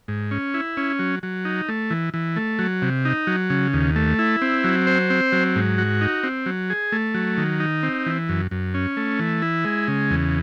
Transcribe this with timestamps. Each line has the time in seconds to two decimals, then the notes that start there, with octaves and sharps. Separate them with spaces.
0.08 G#2
0.31 C#4
0.54 E4
0.77 C#4
0.99 F#3
1.23 F#3
1.45 D#4
1.69 A3
1.91 E3
2.14 E3
2.36 A3
2.59 F#3
2.82 C3
3.05 D#4
3.27 F#3
3.50 C#3
3.73 D#2
3.96 A3
4.19 E4
4.42 C4
4.64 F#3
4.87 C5
5.10 C4
5.32 F#3
5.56 G#2
5.78 F#4
6.01 D#4
6.24 C4
6.46 F#3
6.70 G#4
6.92 A3
7.14 F#3
7.38 D#3
7.60 D#4
7.83 C4
8.06 E3
8.29 F#2
8.51 F#2
8.74 C#4
8.97 A3
9.19 E3
9.42 E4
9.65 G#3
9.88 C#3
10.11 E2